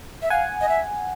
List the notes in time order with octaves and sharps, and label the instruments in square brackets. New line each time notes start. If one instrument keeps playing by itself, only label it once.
[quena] E5
[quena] F5 [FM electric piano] F#5 G#5
[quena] D#5
E5